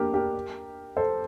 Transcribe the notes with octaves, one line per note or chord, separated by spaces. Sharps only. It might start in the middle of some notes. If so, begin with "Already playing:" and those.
Already playing: A#3 D4 G4 A#4
G4 A#4
A4 C5